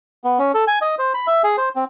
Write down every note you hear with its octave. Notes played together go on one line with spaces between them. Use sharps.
B3
C#4
A4
G#5
D#5
C5
B5
E5
G#4
C5
C4